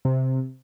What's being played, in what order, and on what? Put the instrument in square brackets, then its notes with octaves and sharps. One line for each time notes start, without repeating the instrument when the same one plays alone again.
[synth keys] C3